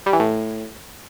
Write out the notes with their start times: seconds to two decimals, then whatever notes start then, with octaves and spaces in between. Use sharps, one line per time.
0.06 G3
0.13 E3
0.20 A2